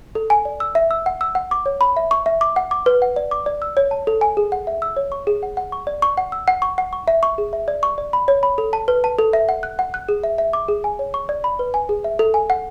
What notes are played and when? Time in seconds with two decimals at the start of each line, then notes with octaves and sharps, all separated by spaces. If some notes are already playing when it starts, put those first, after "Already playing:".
0.15 A4
0.30 G#5
0.45 D5
0.60 E6
0.75 E5
0.91 E6
1.06 F#5
1.21 E6
1.35 F#5
1.51 D6
1.66 C#5
1.81 B5
1.97 E5
2.11 C#6
2.26 E5
2.41 D6
2.56 F#5
2.71 D6
2.86 B4
3.02 F#5
3.16 D5
3.31 D6
3.46 D5
3.62 E6
3.77 C#5
3.91 A5
4.07 A4
4.21 G#5
4.37 G#4
4.52 F#5
4.67 E5
4.82 E6
4.96 C#5
5.12 C#6
5.27 G#4
5.43 F#5
5.57 F#5
5.72 C#6
5.87 D5
6.02 C#6
6.17 F#5
6.32 E6
6.48 F#5
6.62 C#6
6.78 F#5
6.93 C#6
7.08 E5
7.23 C#6
7.38 G#4
7.53 E5
7.68 D5
7.83 C#6
7.98 D5
8.13 B5
8.28 C#5
8.43 B5
8.58 A4
8.73 A5
8.88 B4
9.04 A5
9.19 A4
9.33 E5
9.49 F#5
9.63 F#6
9.79 F#5
9.94 F#6
10.09 G#4
10.24 E5
10.38 E5
10.53 D6
10.68 G#4
10.84 G#5
10.99 C#5
11.14 C#6
11.29 D5
11.44 B5
11.59 B4
11.74 G#5
11.89 G#4
12.04 E5
12.19 A4
12.34 G#5
12.50 F#5